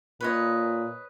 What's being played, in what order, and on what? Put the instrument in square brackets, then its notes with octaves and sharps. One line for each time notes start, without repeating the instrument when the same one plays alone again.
[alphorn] A#2 [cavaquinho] B4 C#5 D#5